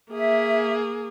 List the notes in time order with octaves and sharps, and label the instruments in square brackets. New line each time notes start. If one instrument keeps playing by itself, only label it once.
[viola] A#3 G#4 [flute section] E5